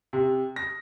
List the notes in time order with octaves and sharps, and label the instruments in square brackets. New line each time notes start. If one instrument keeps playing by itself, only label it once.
[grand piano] C3
A#6